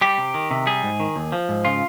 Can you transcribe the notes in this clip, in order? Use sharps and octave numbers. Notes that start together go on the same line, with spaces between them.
G3 G4
C3
D#3
C3
G3 G#4
G#2
D#3
D#2
F3
G#2
C#3 F4